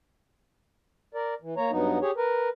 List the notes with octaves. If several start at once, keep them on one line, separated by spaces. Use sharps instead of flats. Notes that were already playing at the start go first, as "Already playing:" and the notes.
A#4 D5
E3
A#3 C#5 A#5
G2 F#3 B3 D#4
G4 G#4 C#5
A#4 B4